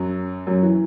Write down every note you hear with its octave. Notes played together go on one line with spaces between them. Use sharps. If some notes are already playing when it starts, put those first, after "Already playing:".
Already playing: F#2 F#3
F#2 F#3
E3